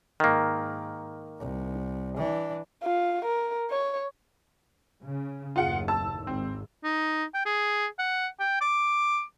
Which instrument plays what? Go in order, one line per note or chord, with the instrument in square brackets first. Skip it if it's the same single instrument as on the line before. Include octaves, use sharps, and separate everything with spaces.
[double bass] G#2 [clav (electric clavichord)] D#3 A#3
[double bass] C2
E3 D4
[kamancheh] F4
A#4
C#5
[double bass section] C#3
[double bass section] F#1 D#2 A2 [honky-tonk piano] F4 G#4 F#5
[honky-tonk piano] A5 E6
[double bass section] G#1 [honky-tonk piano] C4
[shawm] D#4
G5
G#4
F#5
G5
D6